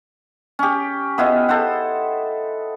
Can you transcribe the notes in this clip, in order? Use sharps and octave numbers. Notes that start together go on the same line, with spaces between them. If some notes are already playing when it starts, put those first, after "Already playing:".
C#4 G4
B3 E4 F4 D#5
A4 C5 F#5